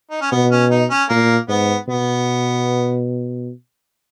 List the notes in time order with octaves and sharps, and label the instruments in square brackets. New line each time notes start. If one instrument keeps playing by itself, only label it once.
[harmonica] D#4
C#4
[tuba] B2 [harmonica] B3
[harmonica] C#4
D#4
C#4
[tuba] A#2 [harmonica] A#3
[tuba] G#2 [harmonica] B3
[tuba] B2 [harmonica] B3